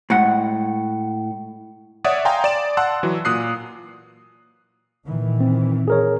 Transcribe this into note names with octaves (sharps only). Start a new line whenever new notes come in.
A2 G#3 F#5
C#5 D5 E5 F#5 D#6
F5 G5 G#5 A#5 C6
D5 E7
F#5 A5 C6 E6 F#6
E3 F#3
A#2 D#6 F#6 C7
A#2 D#3 E3
C4
G#4 A#4 C#5